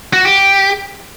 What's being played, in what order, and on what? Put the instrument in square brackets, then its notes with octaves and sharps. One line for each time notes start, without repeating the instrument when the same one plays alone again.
[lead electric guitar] F#4
G4